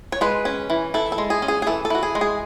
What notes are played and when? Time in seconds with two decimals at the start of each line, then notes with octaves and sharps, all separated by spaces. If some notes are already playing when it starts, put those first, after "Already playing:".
0.12 C#5
0.21 G#3 B4
0.45 C#4
0.70 E3
0.94 E4 A4
1.12 A4
1.18 G#3
1.30 G#4
1.42 C#4
1.48 G#4
1.62 G#4
1.67 E3 A4
1.85 A4
1.90 E4 F#4
2.03 G#4
2.15 G#3
2.21 G#4